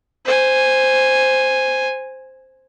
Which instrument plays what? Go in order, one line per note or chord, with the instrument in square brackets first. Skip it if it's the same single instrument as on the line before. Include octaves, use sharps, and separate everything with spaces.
[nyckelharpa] C5 G#5